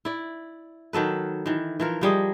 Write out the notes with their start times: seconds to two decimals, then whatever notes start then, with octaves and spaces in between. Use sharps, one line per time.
0.05 E4 D5
0.93 D#3 F#3 A4 B4
1.46 D#3 E3
1.80 E3 F3 A#4
2.01 F3 G3 G#4 D#5